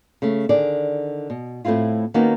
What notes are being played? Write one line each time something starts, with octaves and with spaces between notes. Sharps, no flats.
C#3 A3
D3 D#3 G#4 D5
B2
A2 A3 C4 E4 F4
D#3 A#3 B3 C#4 D#4 F#4